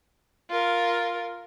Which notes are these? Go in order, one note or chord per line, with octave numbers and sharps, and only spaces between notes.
F4 A#4